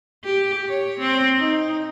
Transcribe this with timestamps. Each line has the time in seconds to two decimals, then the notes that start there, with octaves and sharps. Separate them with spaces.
0.24 G4
0.69 C#5
1.00 C4
1.38 D#4